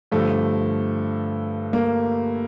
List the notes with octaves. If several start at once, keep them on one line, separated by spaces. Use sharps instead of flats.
G2 D3 F3 A3
A#3